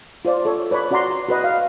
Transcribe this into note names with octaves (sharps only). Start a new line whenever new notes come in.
F4 C5 D5
A4 C#5
B4 C#5 D5 B5
C#4 F#4 D5 F#5 A#5 C6
F#4 B4 D#5
F5